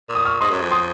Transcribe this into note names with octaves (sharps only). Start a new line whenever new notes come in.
A#2
D#6
C#6 F6
G#2 C6 D#6
F#2
F2
C6 D#6